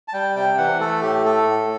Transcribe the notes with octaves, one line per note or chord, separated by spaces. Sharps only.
A5
G3 G5
C3 G5
E3 F#5
A3 A4
A2 G4
A3 A4
A2